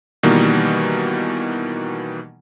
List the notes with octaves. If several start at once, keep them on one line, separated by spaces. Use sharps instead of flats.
B2 D#3 E3 G3 A#3